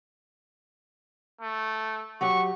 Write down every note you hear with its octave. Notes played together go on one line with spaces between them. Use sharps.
A3
F#3 G4 F#5 C#6